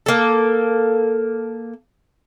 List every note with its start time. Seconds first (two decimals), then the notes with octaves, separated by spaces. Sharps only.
0.06 A#3 A4